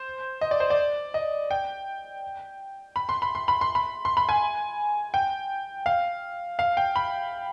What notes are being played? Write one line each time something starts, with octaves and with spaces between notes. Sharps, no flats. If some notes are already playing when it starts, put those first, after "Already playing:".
Already playing: C5
D#5
D5
C5
D5
D#5
G5
B5
C6
B5
C6
B5
C6
B5
C6
B5
G#5
G5
F5
F5
G5
B5